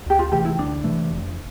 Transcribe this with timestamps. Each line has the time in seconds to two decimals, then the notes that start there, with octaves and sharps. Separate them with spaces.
0.06 D2 G4
0.19 F4
0.32 C3 E3 A3 G4
0.45 E4
0.58 D2 D4
0.84 C3 E3 A3
1.11 F1